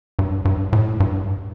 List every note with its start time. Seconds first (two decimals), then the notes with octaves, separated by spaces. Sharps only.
0.19 G2
0.45 G2
0.73 A2
1.00 G2